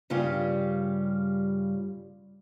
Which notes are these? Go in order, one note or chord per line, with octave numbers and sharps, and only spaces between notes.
G2 C#3 G3 F4